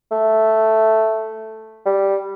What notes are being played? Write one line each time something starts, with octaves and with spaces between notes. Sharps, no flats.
A3
G3